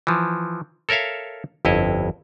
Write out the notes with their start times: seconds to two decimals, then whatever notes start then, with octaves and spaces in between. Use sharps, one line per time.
0.07 E3 F3
0.89 A4 A#4 C#5 E5 F5
1.65 G1 F2 E4 C#5 D#5